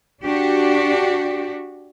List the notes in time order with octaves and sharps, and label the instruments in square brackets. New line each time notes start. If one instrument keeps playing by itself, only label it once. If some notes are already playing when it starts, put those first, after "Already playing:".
[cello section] D4 F#4 G4